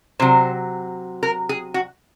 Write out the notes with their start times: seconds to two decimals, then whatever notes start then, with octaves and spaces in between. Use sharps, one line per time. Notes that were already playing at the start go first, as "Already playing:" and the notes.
0.20 C3 F#3 C5
1.23 A#4
1.49 G#4
1.74 F#4